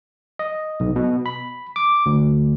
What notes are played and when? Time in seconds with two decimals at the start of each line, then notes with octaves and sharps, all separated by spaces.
0.39 D#5
0.80 B1
0.96 B2
1.26 B5
1.76 D6
2.06 D2